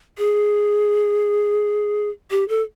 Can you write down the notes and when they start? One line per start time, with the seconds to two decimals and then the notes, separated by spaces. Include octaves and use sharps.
0.18 G#4
2.31 G4
2.49 A4